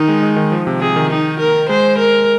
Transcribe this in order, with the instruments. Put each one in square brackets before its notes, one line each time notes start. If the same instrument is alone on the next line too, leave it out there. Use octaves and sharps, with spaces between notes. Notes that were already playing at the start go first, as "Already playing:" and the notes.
Already playing: [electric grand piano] D#3 [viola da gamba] D#4
[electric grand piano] G#3
G#3
D#3
F3
C3
[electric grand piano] C3 [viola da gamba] G#4
[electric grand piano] D#3
[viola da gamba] D#4
A#4
[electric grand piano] G#3 [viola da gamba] C5
[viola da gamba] A#4